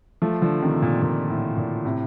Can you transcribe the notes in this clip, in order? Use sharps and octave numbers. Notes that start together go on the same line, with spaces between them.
F3 A3
D3 F3
C3 D#3
A#2
A#2
A2
A#2
A2 C3